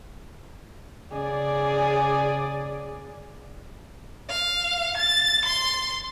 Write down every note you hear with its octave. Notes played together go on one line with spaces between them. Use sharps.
C#3 G#4 D5
F5
A6
C6